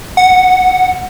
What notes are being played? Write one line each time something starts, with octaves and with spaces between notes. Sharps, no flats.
F#5